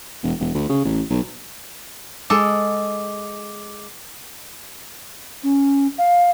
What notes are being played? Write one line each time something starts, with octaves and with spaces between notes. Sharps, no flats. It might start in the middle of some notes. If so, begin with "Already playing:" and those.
E1
E1
D2
C#3
A1
B1
G#3 A4 D6
C#4
F5